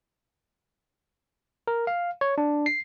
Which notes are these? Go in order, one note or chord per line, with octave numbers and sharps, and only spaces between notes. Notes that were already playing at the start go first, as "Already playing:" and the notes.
A#4
F5
C#5
D4
C7